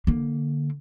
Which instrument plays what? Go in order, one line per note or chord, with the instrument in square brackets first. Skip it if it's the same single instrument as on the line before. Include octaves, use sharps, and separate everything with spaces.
[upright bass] D3 A#3